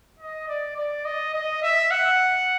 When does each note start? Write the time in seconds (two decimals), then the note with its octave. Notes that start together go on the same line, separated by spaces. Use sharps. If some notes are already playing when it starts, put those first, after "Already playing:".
0.20 D#5
0.48 D5
0.77 D5
1.05 D#5
1.34 D#5
1.63 E5
1.91 F#5